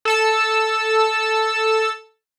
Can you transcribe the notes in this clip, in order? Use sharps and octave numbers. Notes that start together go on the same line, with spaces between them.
A4 A5 E6